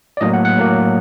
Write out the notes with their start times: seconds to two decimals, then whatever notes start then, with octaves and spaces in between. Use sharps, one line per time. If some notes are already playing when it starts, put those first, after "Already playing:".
0.17 D5
0.21 A2 F#3 A#3 D#5
0.34 F#5
0.45 F#5
0.56 A2 F#3 A#3